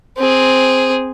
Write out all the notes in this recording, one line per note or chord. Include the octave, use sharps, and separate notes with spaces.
C4 G#4